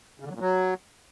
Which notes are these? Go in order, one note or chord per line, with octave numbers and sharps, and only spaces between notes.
C#3
D3
F#3
A#2
F#3